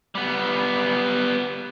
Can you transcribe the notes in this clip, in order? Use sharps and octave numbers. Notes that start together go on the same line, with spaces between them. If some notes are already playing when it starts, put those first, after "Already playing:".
G3 B3